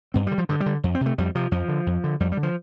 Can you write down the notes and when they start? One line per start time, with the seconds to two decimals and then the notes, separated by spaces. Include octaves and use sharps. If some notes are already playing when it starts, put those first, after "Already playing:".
0.14 G2 C4
0.27 D3 G3
0.38 F3
0.49 G2 D3
0.60 G3
0.66 D3
0.84 F2
0.95 C4
1.01 C3
1.06 A3
1.18 F2 G3
1.35 C3 F3
1.51 F2 F3
1.68 D3
1.86 F2
2.04 D3
2.20 F2 G3
2.32 G3
2.37 D3
2.43 F3